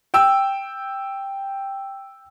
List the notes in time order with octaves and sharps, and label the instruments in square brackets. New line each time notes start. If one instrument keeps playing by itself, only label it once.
[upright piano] G5 E6